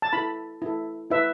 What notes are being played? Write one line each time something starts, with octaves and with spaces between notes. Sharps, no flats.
A5
E4 A4 B5
E4 A4
E4 B4 E5